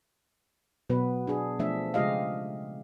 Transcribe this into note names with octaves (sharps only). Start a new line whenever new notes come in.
B2 F#3 B3 B4
D4 G#4
F3 A3 D4 E5
C#3 G#3 F4 G4 D#5 F5